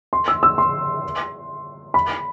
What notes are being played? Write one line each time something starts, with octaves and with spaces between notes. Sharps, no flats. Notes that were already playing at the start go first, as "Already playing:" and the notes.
C6
E6
E6
C6
B5